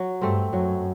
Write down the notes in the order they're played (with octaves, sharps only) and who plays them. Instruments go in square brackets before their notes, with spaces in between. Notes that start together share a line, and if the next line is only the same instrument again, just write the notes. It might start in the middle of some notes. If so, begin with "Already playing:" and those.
Already playing: [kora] F#3
[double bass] G2 [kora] A3 C4
[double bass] F#2 [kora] F#3